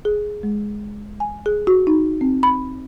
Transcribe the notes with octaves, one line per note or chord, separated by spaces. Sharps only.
G#4
G#3
G#5
G#4
F#4
D#4
C4
B5